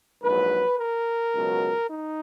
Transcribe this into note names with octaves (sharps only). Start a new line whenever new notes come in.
A#1 G#2 F#3 B4
A#4
C#2 B2 F#3
D#4